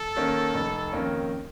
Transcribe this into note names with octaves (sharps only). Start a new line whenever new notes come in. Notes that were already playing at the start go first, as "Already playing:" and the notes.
Already playing: A4
D#3 A#3 C#4
F1
F2 D#3 A#3 C#4